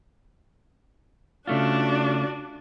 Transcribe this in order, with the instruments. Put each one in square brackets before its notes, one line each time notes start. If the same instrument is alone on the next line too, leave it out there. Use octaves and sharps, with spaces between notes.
[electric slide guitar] C#3 A3 F4 [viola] D4 F#4